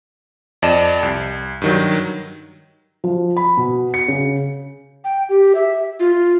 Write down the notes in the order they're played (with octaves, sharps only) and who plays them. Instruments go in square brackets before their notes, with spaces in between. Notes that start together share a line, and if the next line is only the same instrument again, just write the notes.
[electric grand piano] F2 D5 D#5 A5 E7
C2
G2 D#3 F#3
[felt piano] F3
B5
B2
C#7
C#3
[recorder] G5
G4
E5
F4